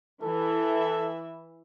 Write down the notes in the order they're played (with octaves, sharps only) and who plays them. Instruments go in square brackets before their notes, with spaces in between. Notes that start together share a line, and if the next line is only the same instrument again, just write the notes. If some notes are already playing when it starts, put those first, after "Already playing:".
[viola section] E3 E5 [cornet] A4